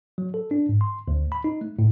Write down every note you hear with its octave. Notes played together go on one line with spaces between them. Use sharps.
F#3
A4
D4
G#2
C6
D2
B5
D#4
A3
A2